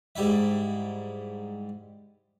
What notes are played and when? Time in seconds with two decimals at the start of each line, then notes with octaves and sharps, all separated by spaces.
0.16 G#2 G3 E4 E5